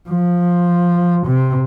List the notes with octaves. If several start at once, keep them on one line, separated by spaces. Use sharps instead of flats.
F3
C3